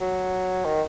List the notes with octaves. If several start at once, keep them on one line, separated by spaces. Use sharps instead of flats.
F#3
D#3